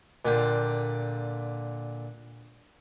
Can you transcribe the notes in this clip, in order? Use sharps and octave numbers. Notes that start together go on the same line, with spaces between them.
A#2 D3 G5